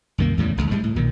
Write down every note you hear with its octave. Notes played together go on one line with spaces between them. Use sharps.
C2 F#2 D#3 A#3
E2 A2 C#3 G3
D#1 G#1 C#2
G#2 G3 G#3
A2
B1 A#2 D#3